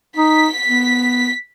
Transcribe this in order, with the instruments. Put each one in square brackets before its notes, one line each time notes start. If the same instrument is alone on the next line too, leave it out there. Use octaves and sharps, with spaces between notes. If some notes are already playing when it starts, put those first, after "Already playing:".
[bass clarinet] D#4 [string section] B6
[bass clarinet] B3